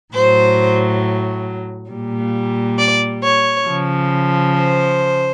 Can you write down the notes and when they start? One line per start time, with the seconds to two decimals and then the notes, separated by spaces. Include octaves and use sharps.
0.14 A2 F#3 C5
1.90 A#2 G3
2.78 D5
3.22 C#5
3.67 C#3 F3
4.55 C5